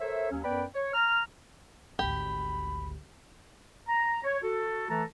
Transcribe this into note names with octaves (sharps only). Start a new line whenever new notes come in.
A4 A#4 C5 C#5 E5
D#2 F#3 C#4
F#2 B3 B4 D5 G5 B5
C#5
A#5 F6
G#1 D2 G4 B5
A#5
C#5
F#4 A4
E3 A3 A4 A5 A#5